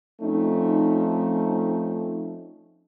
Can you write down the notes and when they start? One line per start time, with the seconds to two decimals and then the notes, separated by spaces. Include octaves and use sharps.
0.21 F3 A3 C4 C#4 D#4